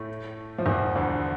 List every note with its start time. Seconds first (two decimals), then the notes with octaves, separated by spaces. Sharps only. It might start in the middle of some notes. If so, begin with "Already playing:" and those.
Already playing: A2 A3
0.58 F3
0.66 E2 E3
0.95 D2 D3